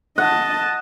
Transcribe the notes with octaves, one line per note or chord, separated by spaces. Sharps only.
D#5 F#5 A5